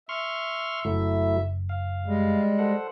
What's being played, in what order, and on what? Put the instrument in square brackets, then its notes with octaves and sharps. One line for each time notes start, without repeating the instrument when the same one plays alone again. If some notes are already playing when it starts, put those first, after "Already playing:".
[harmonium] E5 [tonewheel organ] C6 C#6 F6
[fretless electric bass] F#1 [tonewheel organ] F#3 A3 E4
[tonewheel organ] F5
[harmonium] G3 G#3
[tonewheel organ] A4 C5 F#5